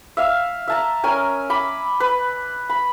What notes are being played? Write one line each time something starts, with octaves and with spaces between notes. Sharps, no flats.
E5 F5
E5 A5 A#5
C#4 A#4 G#5
B5 D6
B4
B5